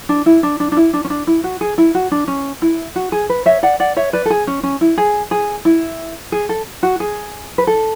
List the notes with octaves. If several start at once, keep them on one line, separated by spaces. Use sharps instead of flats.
D4
E4
D4
D4
D4
E4
D4
C#4
D4
E4
F#4
G#4
E4
F#4
D4
C#4
E4
F#4
G#4
B4
C#5 E5
D5 F#5
D5 F#5
C#5 E5
B4 D5
A4
G#4
C#4
C#4
E4
G#4
G#4
E4
G#4
A4
F#4
G#4
B4
A4